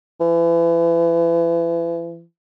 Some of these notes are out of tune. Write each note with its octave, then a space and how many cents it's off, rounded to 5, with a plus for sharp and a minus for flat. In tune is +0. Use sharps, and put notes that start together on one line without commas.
E3 +35